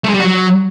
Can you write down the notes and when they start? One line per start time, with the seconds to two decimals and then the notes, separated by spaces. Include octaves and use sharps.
0.04 A3
0.09 G#3
0.14 G3
0.19 F#4
0.24 F#3